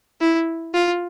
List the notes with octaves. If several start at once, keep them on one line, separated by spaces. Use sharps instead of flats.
E4
F4